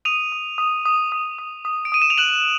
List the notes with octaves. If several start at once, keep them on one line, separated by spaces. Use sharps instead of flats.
D#6 D#7 F7
D#6
D#6
D#6
D#6
D#6
D#6
D7
D#6 D#7
E7
F7
F#6 E7 F#7